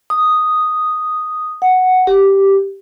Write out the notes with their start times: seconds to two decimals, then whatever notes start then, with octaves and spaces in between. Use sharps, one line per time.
0.10 D#6
1.62 F#5
2.07 G4